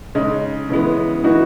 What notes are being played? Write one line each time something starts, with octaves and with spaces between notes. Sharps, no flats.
C#3 G#3 D#4
C#3 E3 G#3 B3
E3 B3 D#4 F#4